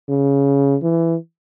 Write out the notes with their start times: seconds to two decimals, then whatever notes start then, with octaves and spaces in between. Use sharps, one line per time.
0.09 C#3
0.82 E3